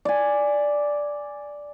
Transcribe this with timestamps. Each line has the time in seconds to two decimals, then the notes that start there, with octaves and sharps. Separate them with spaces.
0.05 D5 G#5